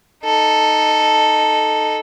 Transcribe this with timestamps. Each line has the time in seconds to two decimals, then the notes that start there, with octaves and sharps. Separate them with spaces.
0.25 D#4 A4